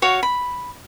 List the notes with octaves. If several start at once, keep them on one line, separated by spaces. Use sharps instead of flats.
F#4 C#5 F5
B5